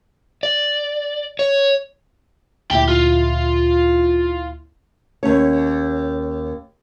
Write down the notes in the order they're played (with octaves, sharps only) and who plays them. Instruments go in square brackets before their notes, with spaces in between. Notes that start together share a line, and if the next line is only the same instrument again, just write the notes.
[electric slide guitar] D5
C#5
[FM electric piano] D2 A#2 E4 [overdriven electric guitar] G4 G5
[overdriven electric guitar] F4
[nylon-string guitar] D#2 C#4 C#5